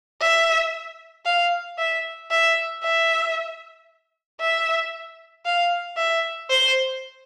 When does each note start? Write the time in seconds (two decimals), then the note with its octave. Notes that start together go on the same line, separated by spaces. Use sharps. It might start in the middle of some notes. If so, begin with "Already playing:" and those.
0.21 E5
1.26 F5
1.78 E5
2.31 E5
2.83 E5
4.41 E5
5.46 F5
5.97 E5
6.50 C5